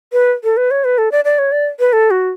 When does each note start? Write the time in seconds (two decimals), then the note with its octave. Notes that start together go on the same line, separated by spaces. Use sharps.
0.13 B4
0.44 A4
0.57 B4
0.71 C#5
0.84 B4
0.98 A4
1.12 D5
1.25 D5
1.39 C#5
1.52 D5
1.80 B4
1.93 A4
2.11 F#4